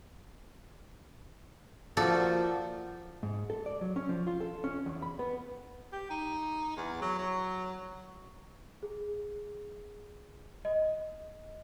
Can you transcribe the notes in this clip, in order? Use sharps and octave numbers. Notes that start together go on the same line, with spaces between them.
F3 A#3 F#4 A4 D5
G#2
A4
D5
F#3
C#4
F3
F4
A4
C#4
E2
B5
B3
G4
D#4
E2
F#3
F#3
G#4
D#5